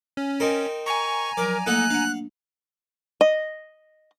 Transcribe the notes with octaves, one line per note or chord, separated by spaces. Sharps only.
C#4
C4 D#4 A#4
G#5 A#5 C#6
F3 F#3 A#4 D5
A3 A#3 D#4 A4 D#5 F#5 F#6
D4 F5 F#5
D#5